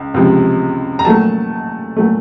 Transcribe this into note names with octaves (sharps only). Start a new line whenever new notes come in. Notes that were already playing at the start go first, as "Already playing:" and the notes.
Already playing: C#2
C#2 C3 F3
A#5
A#2 F#3 A3 A5
A#2 F#3 A3